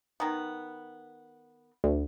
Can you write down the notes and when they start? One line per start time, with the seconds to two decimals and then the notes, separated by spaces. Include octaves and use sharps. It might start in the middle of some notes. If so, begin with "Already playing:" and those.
0.20 D#3 B3
1.84 D2